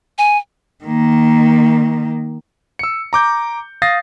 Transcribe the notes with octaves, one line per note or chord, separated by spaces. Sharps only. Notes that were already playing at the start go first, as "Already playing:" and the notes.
G#5
D#3 A#3
E6 C#7
A#5 D6 G6
F5 D#6 A6 A#6 C7